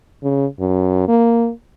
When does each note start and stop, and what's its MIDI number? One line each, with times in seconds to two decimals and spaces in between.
0.23 0.46 49
0.60 1.08 42
1.08 1.51 58